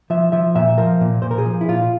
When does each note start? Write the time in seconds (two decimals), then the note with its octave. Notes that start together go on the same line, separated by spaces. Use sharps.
0.10 F3 E5
0.32 F3 E5
0.55 A#2 E5
0.78 F3 A#4
1.01 A#2
1.22 A#2 C5
1.31 A#4
1.38 G#4
1.46 F3
1.61 E4
1.68 A#2 F4